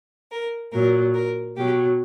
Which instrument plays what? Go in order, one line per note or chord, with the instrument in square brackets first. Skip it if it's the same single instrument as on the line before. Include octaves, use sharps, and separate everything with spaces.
[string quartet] A#4
A#2 F#3 A#4
A#4
B2 F#3 G4